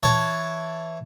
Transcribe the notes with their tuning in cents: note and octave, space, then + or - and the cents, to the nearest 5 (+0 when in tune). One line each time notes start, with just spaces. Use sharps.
E3 +0 C#5 +0 A5 +0